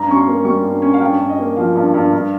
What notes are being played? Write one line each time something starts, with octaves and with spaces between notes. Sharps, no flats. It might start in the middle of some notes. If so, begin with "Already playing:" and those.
Already playing: G2 A#5
C#4 C#6
C6
A#3
G3 C#6
G2
C#4
F5
G2 G5
G2
D#5
A#3
F3 F5
G2
G2
G2